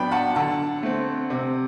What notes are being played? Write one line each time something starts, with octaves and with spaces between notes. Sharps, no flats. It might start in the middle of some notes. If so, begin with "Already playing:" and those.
Already playing: A2 F#3 B3 D4 G5 B5
F#5 A5
D3 F#5 A5
A3 C4
C3